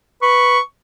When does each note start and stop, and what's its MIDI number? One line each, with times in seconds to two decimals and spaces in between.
0.22 0.58 71
0.22 0.60 85